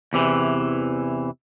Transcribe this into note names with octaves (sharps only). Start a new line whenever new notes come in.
E2 C3 E3